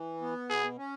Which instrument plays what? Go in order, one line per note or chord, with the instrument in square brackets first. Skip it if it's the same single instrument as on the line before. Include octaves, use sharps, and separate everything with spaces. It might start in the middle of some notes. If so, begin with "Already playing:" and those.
Already playing: [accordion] E3
B3
[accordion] B2 [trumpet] G#4
[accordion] C#4